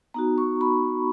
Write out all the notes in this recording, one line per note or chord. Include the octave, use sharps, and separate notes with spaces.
B3 D#4 F#4 A#5
C#6
B5